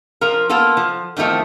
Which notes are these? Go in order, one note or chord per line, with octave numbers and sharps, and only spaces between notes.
F3 F4 A#4
A#3 B3 F4 A4
F3
E2 D#3 F3 A3 C4